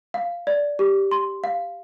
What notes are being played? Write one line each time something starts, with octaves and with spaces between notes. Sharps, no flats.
F5
D5
G4
C6
F5